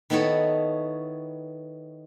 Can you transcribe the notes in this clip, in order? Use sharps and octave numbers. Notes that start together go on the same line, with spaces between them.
D#3 B3 E4 A4 C#5